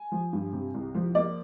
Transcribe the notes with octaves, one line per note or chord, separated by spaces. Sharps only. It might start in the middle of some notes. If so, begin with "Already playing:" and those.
Already playing: G#5
F3
G2
C3
C2
F3
A#3 D5